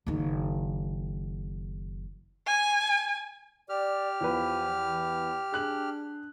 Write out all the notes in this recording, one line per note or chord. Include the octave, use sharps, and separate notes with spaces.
F#1 D#3
G#5
G4 D5 F6
E2 F3 B4
E3
D4 G#4 F#6 F#7